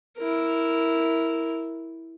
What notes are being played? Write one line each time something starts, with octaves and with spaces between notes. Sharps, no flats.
E4 A#4